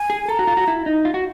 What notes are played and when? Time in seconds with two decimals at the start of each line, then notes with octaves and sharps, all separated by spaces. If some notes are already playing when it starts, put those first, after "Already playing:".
Already playing: G#5
0.10 G#4
0.28 A4 A#5
0.39 F#4
0.47 F4
0.57 F#4
0.68 E4
0.86 D#4
1.05 F4
1.14 F#4